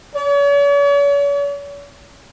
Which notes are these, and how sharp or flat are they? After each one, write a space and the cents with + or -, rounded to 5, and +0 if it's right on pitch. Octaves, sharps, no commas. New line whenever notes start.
C#5 +45